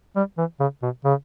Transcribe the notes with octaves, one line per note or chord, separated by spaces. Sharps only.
G3
E3
C#3
B2
C#3